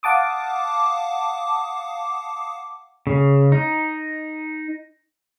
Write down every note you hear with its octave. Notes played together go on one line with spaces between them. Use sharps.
F5 F#5 A5 D6 D#6
C#3
D#4